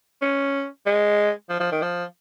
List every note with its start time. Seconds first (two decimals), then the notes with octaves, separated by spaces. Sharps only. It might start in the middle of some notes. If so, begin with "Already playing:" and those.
0.22 C#4
0.86 G#3
1.50 F3
1.60 F3
1.71 D#3
1.82 F3